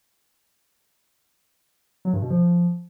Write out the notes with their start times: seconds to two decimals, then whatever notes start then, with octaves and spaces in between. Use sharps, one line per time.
2.05 F#3
2.13 G2
2.22 B2
2.30 F3